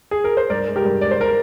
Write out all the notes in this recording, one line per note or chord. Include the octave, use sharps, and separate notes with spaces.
G#4
A#4
C5
G2 A#4 D5
G#3
G4 A#4
G2
G#3 D5
C5
A#4